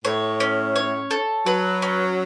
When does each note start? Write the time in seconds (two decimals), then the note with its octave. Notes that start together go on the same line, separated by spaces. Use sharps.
0.05 A2 C#5
0.40 C#4
0.76 C#5
1.11 A4
1.46 F#3 B4
1.82 C#4